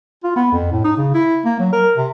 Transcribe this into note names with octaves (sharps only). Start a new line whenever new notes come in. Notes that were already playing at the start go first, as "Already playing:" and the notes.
F4
B3
F2
A2
D#4
C#3
E4
A#3
F#3
A#4
C3